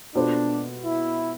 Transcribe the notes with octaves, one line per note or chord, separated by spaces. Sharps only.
B2 B3 D4 F4 A4 C5
E4